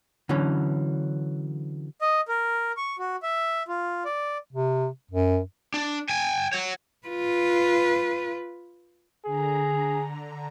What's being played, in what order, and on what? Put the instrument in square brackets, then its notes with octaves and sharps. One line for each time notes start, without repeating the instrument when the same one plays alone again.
[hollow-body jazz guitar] D3 E3 F#3 C#4
[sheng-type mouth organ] D#5
A#4
C#6
F#4
E5
F4
D5
[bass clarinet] C3
F#2
[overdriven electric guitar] D4
G5 G#5
C#5 F#5
[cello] F4 B4
[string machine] D3 A#5 [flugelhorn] G#4